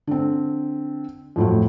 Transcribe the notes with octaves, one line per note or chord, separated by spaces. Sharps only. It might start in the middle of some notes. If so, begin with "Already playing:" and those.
D3 C4
F2 A2 F#3